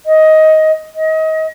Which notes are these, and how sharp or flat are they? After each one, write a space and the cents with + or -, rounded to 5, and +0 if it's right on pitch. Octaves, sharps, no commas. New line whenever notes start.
D#5 +15
D#5 +30